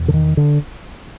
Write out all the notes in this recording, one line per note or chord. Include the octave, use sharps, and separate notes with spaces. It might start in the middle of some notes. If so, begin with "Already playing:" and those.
Already playing: E2 B2
D3
D#3
D3